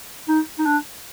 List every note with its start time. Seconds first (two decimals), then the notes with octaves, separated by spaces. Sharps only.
0.28 D#4
0.59 D#4
0.66 D4